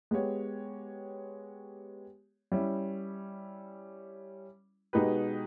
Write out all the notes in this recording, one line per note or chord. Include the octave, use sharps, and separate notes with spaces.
G#3 B3 G4 C#5
G3 C#4 E4
B2 G#3 D#4 G4 B4